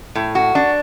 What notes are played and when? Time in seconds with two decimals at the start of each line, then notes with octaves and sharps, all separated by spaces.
0.15 A2
0.35 F#4
0.55 D4